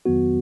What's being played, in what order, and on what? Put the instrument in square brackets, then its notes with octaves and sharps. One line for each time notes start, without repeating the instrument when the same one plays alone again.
[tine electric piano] F2 D#3 F#3 B3 F#4